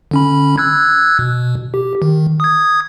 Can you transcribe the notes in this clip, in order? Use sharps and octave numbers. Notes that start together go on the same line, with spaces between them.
D3 C#4 B5
E6 F#6 G#6
B2
G4
D#3
D#6 G#6